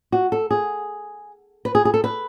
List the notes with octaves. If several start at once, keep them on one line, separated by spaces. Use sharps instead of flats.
F#4
A4
G#4
B4
G#4
G#4
A4
B4